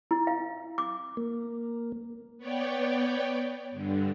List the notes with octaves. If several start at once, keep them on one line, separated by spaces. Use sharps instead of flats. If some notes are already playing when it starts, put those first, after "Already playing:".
E4
F5
D6
A#3
B3 C#5 D5 G5
G2 D3